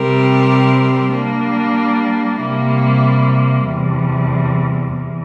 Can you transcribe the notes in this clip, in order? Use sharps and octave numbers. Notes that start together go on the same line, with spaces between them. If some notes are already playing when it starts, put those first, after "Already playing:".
Already playing: C3 G3 C4 G4 A#4
G3 A#3 D4
C3 G3 A#3 E4
E2 C3 G3
E2